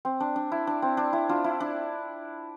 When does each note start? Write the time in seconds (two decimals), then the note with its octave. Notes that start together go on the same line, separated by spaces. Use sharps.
0.05 C4
0.20 D4
0.36 D4
0.52 E4
0.67 D4
0.82 C4
0.97 D4
1.13 E4
1.29 D4 F4
1.44 E4
1.60 D4